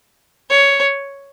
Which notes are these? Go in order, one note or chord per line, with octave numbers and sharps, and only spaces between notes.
C#5